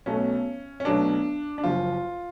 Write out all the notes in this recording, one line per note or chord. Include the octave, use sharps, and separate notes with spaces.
B1 B2 F#3 A3 C#4
C#4
B1 B2 F#3 A3 D4
D4
F#1 F#2 F3 F4